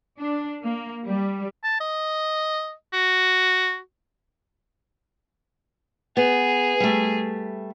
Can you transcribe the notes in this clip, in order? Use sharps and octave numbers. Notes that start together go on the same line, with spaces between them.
D4
A#3
G3
A5
D#5
F#4
B3 G#4
G3 A3